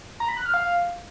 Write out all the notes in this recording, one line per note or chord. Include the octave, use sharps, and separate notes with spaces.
A#5
B5
F#6
F6
F5